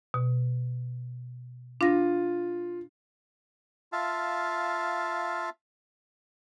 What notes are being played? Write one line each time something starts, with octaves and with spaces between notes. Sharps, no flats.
B2
D4 F4 A#6
F4 E5 F5 A5